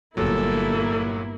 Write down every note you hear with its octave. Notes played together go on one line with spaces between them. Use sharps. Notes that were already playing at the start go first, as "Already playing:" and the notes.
G1 A#2 F#3 A#3 E4 A4